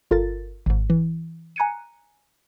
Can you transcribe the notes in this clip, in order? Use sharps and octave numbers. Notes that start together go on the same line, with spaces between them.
G1 F4 A4 A#4 A6
G#1 G#2
E3
G#5 A#5 F#6 G#6 C#7 D#7